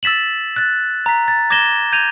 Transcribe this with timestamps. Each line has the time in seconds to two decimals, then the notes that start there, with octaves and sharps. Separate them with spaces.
0.03 E6 A6 B6 E7 F#7
0.56 F#6 A6
1.06 A#5 B6
1.28 A6
1.50 D6 G#6 A#6 E7 G7
1.92 G6 G#6 D#7 F7